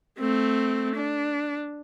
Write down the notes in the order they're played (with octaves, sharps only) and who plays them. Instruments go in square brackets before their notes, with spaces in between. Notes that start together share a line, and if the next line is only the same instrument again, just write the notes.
[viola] A3 C4
D4